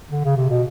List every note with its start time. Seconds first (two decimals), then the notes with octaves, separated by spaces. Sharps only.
0.11 D3
0.25 C#3
0.37 C3
0.50 B2